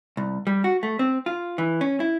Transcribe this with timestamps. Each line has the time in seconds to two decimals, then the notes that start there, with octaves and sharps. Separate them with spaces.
0.17 C2
0.47 G3
0.64 F#4
0.83 A3
0.99 C4
1.26 F4
1.58 E3
1.81 C#4
2.00 E4